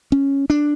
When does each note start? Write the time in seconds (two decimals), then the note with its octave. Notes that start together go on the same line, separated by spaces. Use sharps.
0.12 C#4
0.50 D4